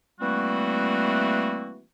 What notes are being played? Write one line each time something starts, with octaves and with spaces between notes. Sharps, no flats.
E3 G3 A3 A#3 C4 F#4